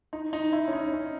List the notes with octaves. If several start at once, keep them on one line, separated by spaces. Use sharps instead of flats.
D#4
D#4
E4
C#4
D#4
C#4